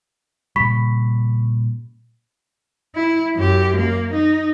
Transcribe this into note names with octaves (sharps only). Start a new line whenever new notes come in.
A#2 C#3 G3 B5 C#6 B6
E4
F#2 G4
A#3
D#4